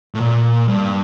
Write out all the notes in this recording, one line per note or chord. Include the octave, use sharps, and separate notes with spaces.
A2
A#2
G2